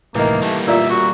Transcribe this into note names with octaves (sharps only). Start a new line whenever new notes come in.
C2 A2 D#3 E3 A#3
G3 A3 A#3
A#2 E5
F#4